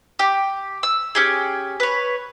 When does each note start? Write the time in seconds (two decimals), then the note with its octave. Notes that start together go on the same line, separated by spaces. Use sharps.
0.19 G4
0.83 E6
1.15 C#4 G4 G#4
1.80 B4 C#5